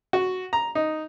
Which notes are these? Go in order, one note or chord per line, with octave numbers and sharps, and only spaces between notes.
F#4
A#5
D#4